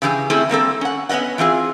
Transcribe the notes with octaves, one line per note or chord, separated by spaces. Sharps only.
C#3 E3 G4 G#4
A3 C4 C#4 E4 G4 G#4
G3 A#3 C4 A4
C#4 F#5
B3 C#4 B4 D#5 F#5
E3 C4 F4 G#4